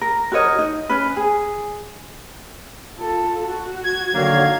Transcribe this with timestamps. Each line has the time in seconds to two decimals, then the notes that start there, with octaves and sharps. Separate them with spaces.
0.01 A#4
0.32 F#4 A#4 C#5 D#5
0.58 D#4
0.89 C#4 B4
1.17 G#4
2.98 F4 A4
3.44 F#4
3.84 G#6
4.15 D3 D#3 F#3 A#3 F5